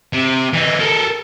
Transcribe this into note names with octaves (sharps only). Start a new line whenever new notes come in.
C3
E3 D#4
A4 A#4